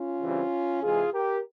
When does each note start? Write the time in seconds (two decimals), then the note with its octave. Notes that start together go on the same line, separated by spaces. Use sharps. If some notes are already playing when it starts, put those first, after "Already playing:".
Already playing: C#4 F4
0.20 C#3 E3 G3 C4
0.82 C3 E3 G#3 F4 G#4
1.12 G4 A#4